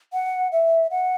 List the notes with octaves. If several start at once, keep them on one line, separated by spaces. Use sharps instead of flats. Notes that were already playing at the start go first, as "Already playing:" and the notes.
F#5
E5
F#5